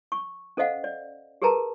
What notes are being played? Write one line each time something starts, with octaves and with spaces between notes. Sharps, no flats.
C#6
C#4 A4 C5 D#5 F5 F#5
D5
G4 G#4 A#4 B4 A5 A#5